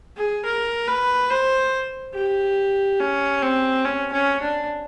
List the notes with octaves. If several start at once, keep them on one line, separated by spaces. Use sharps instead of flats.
G#4
A#4
B4
C5
G4
C#4
C4
C#4
C#4
D4